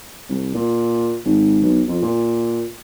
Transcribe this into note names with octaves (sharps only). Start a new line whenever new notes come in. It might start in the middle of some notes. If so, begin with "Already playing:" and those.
C2
A#2
G#1
B1
F2
A#2